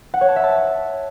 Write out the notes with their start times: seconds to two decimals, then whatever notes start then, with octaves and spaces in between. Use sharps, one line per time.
0.14 F#5
0.21 C#5
0.29 A5
0.36 E5
0.44 A5